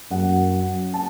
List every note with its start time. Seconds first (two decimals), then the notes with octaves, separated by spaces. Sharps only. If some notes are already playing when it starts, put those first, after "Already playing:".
0.11 F#2 F#5
0.94 A5